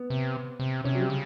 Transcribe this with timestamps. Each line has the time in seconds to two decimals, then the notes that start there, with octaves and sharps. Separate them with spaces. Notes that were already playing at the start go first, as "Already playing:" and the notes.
Already playing: B3
0.10 C3
0.60 C3
0.84 C3 C#4
0.95 F#3
1.01 G3
1.10 C#3